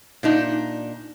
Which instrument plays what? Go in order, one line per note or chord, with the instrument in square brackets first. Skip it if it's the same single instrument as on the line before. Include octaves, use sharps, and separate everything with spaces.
[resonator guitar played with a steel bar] A#2 D4 D#4